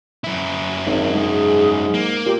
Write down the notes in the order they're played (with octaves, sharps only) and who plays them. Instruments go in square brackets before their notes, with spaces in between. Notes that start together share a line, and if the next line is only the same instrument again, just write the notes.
[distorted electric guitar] F#2 E4
[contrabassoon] G#1 [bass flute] D#4
[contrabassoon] G#2 [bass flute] G#4
[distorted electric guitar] A#3
[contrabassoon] A#2 [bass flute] G4